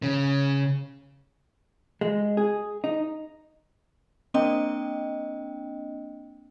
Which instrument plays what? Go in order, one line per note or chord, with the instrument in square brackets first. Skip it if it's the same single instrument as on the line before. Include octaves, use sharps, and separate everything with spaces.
[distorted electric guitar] C#3
[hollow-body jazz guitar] G#3
G#4
D#4
[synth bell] A#3 C4 D4 D#5 G5